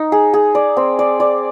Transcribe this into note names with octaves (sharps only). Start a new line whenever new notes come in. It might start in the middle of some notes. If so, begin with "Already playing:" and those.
Already playing: D#4
G#4
G#4
D5
C4
D5
D5